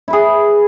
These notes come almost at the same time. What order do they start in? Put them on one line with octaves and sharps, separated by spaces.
E4 B4 G#4